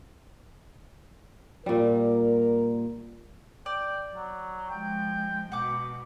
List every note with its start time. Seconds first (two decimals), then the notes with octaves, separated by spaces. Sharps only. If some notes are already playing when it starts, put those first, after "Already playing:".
1.66 A#2 G3 A#4
3.66 D5 G5
4.14 F#3
4.70 F3 G#3 G5
5.52 B2 F#5 D6